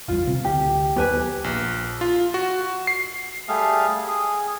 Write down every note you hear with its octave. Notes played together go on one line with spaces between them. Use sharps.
A1 E2 G3 F4
C3 C4
D2 G4
D#2 B3 G4 B4 G#5
A#1
F4
F#4
C7
G3 A3 G#4 F5
G#4